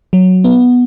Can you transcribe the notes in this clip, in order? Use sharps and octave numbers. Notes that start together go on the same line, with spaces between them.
F#3
B3